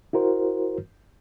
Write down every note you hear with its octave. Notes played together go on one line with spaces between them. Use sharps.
E4 F#4 A#4 C5